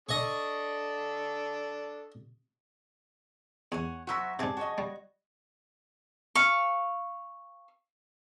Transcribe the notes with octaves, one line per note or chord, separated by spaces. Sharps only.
D4 A4 D#5 C#6
E2 C#5 F#5 G#5
F#3 F#4 C5 E5 B5
G2 C3 G#4 A5 D6
F#4 C#5 D#5
G3
F5 C#6